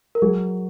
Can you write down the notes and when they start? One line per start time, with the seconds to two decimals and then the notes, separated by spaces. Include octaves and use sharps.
0.15 A#4
0.22 F#3 G#4